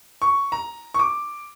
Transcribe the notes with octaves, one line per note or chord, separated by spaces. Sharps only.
C#6
A#5
C#6
D6